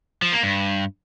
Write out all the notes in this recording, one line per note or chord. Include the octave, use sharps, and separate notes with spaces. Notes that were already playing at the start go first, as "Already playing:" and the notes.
F3
A#3
G2